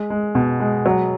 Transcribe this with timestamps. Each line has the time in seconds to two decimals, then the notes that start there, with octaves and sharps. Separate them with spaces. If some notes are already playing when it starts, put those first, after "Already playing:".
Already playing: G#3
0.10 G#3
0.35 B2
0.60 G#3
0.86 F#3